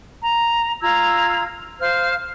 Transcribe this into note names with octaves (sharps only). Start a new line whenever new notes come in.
A#5
F4 A#5 E6 G#6
C5 F5 F6